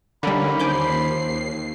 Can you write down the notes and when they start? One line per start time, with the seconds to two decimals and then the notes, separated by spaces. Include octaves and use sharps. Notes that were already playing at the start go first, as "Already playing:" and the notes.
0.23 D3 G3 A#3 C#4 D#4 B5
0.60 D#2 F3 G#5 D6 G6 C7